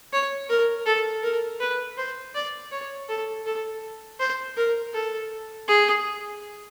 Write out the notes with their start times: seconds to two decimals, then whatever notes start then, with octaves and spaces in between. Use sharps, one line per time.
0.13 C#5
0.49 A#4
0.86 A4
1.23 A#4
1.60 B4
1.98 C5
2.35 D5
2.72 C#5
3.09 A4
3.46 A4
4.19 C5
4.57 A#4
4.94 A4
5.68 G#4